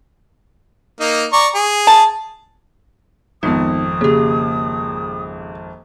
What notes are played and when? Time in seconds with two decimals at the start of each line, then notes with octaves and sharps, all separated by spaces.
1.00 A#3 D#4
1.33 D5 A#5 C#6
1.55 G#4
1.87 A5
3.43 G#1 F2 B3 D#4 D#6
4.01 C#3 A#3 G4